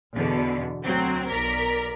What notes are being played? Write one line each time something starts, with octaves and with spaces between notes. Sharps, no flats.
E2 B2 D3
D2 F#3 C4
B1 A#4 D5 B6